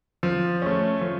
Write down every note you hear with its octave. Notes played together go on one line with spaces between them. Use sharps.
F3
A3 C#4
F3